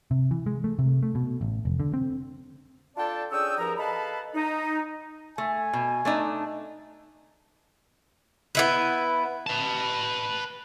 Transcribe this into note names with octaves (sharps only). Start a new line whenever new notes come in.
C3
E3
G#3
A3
C3
A3
B2
A1
F1
D3
C4
D4 F4 A4 D5 G5 A5
C#4 D4 G#4 G5 D#6 E6
E2 G2 F3 G#4 A#4 A#5
A4 B4 D#5 F5 A5 B5
D#4
A3 G#5
B2
A3 D4 D#4
B3 E4 B4
B4 A5